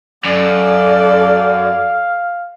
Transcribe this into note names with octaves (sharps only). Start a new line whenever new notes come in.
F#2 A4 D5 F5